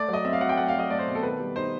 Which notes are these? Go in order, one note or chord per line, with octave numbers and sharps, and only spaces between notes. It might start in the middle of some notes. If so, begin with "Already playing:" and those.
Already playing: A3 D5
F#3 D#5
C4 E5
F5
F#3 F#5
G5
A3 F#5
F5
F#3
D#5
A3 D5
C5
B2
A4
D#3 B4
G3
D#4 C5